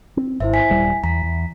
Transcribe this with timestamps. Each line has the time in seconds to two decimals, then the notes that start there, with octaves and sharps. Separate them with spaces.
0.17 C4
0.40 G#1 E4 C5 E5
0.53 G#5 B6
0.70 D#1 G3
1.04 E2 A#5 B6
1.23 E2